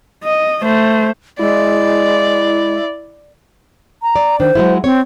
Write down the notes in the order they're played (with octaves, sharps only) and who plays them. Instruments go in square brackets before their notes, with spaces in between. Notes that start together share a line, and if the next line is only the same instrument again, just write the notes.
[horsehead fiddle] D#5
A3 C5
[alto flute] G#3 [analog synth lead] E4 [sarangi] D5
[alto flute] A#5
[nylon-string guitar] D5
[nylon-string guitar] D#3 D4 [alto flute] C5
[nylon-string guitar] F#3 G#3 E4
[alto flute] C4 [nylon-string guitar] C#5